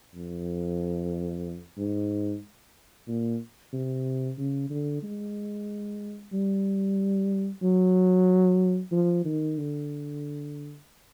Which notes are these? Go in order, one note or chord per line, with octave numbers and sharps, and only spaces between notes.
F2
G#2
A#2
C3
C#3
D3
G#3
G3
F#3
F3
D#3
D3